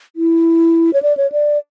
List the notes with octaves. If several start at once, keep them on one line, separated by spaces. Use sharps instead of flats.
E4
C#5
D5
C#5
D5